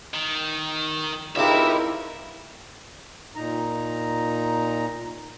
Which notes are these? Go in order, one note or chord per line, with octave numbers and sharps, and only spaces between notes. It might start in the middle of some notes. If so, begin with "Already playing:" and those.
D#3
C#2 C3 D#4 E4 A#4 E5
A#2 D#4 A#5